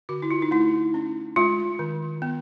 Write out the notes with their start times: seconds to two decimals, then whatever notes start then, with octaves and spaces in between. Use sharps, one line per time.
0.09 D3 F#4
0.22 E4
0.31 F4
0.42 D#4
0.51 A3 E4
0.94 C#4
1.36 G#3 F4
1.79 D#3
2.22 B3